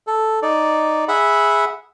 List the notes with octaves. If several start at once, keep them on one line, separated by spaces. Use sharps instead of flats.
A4
D#4 D5
G#4 E5 F#5 B5